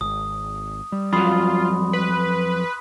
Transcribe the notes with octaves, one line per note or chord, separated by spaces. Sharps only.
G#1 D#6
G3
F2 F#3 F4 B5 C6 D#6
B4